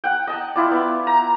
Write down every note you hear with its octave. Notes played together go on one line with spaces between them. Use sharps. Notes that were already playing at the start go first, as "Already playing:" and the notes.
F#5 G5
D#5 A5
E4 F4 D5
B3
A#5